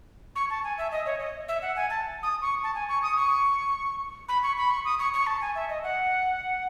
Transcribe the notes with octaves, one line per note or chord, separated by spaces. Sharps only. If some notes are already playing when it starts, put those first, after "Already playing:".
C#6
A5
G#5
E5
D#5
C#5
D#5
E5
F#5
G#5
A5
D#6
C#6
A5
G#5
C#6
D#6
C#6
B5
C#6
B5
C#6
D#6
C#6
C#6
A5
G#5
E5
D#5
F#5